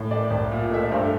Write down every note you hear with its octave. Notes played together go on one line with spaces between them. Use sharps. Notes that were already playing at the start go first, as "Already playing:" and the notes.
Already playing: A2
A3 D5
C2
A#2
A3 E5
D5
G2 C5
A4